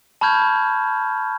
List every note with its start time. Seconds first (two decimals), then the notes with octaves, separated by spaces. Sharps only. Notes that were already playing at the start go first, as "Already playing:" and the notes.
0.21 A5 B5 C#6 F6 G6 G#6